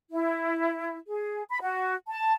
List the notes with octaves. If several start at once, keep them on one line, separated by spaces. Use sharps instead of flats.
E4
G#4
B5
F#4
A5